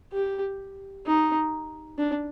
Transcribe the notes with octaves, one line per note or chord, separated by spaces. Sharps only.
G4
D#4
D4